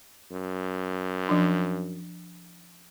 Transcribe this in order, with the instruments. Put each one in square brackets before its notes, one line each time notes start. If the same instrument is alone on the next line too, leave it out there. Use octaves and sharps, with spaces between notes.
[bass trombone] F#2
[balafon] F3 D4